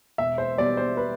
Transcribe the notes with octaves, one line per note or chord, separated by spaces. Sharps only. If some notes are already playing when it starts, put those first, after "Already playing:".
E1 E5
C5
E2 B2 G3 D5
C5
B4